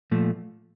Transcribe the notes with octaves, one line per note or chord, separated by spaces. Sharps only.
A#2 F3 A3